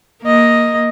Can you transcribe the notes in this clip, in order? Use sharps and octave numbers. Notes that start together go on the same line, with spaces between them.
A#3 D#5